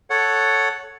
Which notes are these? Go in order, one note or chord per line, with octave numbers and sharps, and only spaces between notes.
A4 C#5 F#5